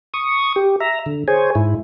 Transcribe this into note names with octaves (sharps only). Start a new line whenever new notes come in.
C#6 D#6
G4
E5 A#5
D3
G#4 C5 C#5 G#5
G#2 E4